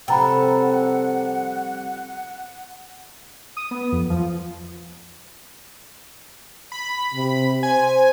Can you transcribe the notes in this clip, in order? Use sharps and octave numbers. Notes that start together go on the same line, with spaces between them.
C3 F3 G3 A4 F#5 G5 A#5 B5
D#6
B3
F2
F3
B5
C3
C5 G#5